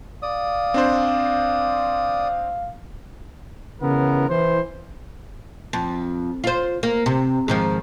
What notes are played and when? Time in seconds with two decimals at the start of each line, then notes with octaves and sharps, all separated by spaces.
0.22 D5 F5 D#6
0.74 C4 D4 C5
3.82 C#3 E3 B3 A#4
4.29 E3 C5
5.73 F2
6.44 F4 C5
6.83 A#3
7.06 C3
7.48 G#2 D#3 F3